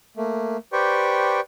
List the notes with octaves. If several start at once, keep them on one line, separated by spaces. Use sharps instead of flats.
A3 A#3
G4 B4 C5 D5 G5 C#6